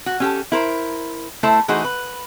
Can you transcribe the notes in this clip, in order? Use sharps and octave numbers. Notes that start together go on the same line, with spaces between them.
F#4
C#4 G4 A4
E4 A#4 C5
A3 E4 A4 C5 E5
E3 A3 D#4 F#4 G#4 C5
B4